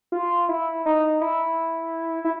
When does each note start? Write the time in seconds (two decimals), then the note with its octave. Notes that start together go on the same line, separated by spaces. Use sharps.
0.12 F4
0.49 E4
0.86 D#4
1.21 E4
2.25 E4